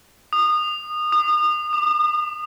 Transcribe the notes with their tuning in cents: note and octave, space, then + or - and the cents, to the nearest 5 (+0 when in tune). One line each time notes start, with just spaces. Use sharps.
D#6 -25
D#6 -35
D6 +35